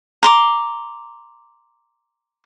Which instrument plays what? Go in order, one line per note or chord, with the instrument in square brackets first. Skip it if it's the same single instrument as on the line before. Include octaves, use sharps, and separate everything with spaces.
[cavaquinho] A#5 C6 D6